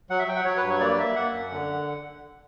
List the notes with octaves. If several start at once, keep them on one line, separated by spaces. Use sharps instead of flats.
F#3 F#5
E5
F#3 G5
F#5
F#3 C#5
B4
G2
C#5
A#3 D5
A#3 E5
A#3 F#5
F#2
D3